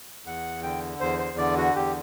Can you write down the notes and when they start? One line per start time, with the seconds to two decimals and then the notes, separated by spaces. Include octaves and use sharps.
0.26 E2 F#5
0.63 D3 G5
1.00 E2 C5
1.19 C5
1.38 D3 D5
1.57 F#4
1.76 E2 G4